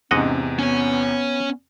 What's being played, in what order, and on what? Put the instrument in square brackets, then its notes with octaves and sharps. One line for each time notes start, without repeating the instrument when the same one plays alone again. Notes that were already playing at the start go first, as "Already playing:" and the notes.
[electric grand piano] E2 C3 [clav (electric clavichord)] G#2 D#5 F#5 [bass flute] C#4
[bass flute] B3 [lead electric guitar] C#4 C#5